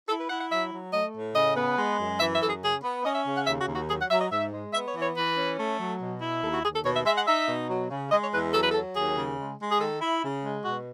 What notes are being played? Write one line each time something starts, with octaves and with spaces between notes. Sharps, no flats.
E4 A4
B4
E4 F#5
F#5
F#3 E5
F#3
A3 D#5
A2
C#3 D#5
B3
G#3
F#2
E3 E5
E5
F#2 A4
G#4
C#3 G#4
B3
C#4 D#5
E5
C#3
F#5
D#2 E5
F#4
D#2
F#4
F#3 G#4
F#5
F#3 E5
D#5
G#2 E5
G#3
B3 E5
C#5
E3
C#5
E3 B4
C#4
A3
F#3
B2
E4
D#2 A4
F#4
D#2 G#4
A4
B2 C#5
E5
G#3 E5
F#5
D#4 E5
B2
F#3
C#3
G#3 D#5
C#5
E2 B4
F#3 A4
B4
A4
F#3
D#2 G#4
C#3
G#3
G#3
G#4
D#3 A4
E4
C#3
G#3
B2 F#4